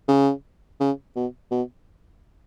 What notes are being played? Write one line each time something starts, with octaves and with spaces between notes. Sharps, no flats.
C#3
C#3
B2
B2